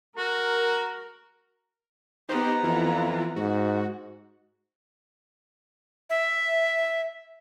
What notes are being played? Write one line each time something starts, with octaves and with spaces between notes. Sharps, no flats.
F#4 A#4
B3 D#4 G4 C5 A#5
F2 E3 E4 F4
G#2 F#4
E5